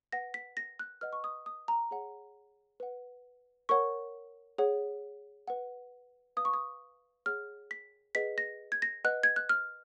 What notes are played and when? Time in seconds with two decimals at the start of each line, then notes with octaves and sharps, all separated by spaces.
0.12 B4 F#5 A#6
0.34 B6
0.57 A#6
0.79 F#6
1.01 B4 D#5 F#5 F6
1.13 C#6
1.24 D#6
1.46 D#6
1.68 A#5
1.91 G#4 C#5 F#5
2.80 B4 F#5
3.69 A#4 C#5 F#5 C#6
4.58 G#4 C#5 F#5
5.48 B4 F#5
6.37 B4 F5 D#6
6.45 C#6
6.54 D#6
7.26 G#4 C#5 F#5 F6
7.71 B6
8.15 G#4 B4 D#5 F#5 B6
8.38 A#6
8.72 G#6
8.82 A#6
9.04 B4 D#5 F#5 F#6
9.23 G#6
9.36 F#6
9.49 F6